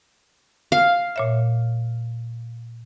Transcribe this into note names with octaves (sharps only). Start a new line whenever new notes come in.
F5
A#2 C#5 E5